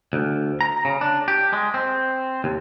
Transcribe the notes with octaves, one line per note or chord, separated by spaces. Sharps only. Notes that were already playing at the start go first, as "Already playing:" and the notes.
D2
A#5
C#3
D4
G4
G#3
C4
D#2